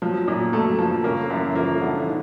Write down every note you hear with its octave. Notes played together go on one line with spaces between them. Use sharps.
F#2 F3 F#3
A#2
F#2 F#3 A3
G2 F3 G3
C#3 A#3 C#4
F#2 E3 E4
F3 A#3 F4
D3 E3 E4
D#3 D#4